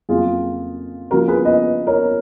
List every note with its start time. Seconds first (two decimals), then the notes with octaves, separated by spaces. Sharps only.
0.09 F2 C#3 F#3 A#3 F4 G#4
1.11 C#3 F3 A#3 F#4 A#4
1.28 G#4 B4
1.45 B4 D#5
1.87 A#4 C#5